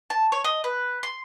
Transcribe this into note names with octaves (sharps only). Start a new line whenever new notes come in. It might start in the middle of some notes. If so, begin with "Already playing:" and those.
A5
C#5
D#5
B4
C6